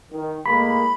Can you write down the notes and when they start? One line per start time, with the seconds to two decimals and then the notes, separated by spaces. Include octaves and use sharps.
0.11 D#3
0.46 A2 G#3 A#3 B5